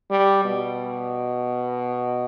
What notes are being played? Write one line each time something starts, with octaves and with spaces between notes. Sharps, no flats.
G3
B2